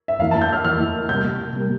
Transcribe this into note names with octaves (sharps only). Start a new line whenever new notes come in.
E5
F2 E3 A#3 E4 F5
A5
G6
F6
F2 E3 A#3 E4 F6
C3 G3 A#3 G6
C3 G3 A#3